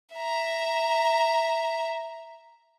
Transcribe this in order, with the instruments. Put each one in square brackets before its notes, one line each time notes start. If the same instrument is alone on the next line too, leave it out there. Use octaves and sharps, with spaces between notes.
[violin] E5 A#5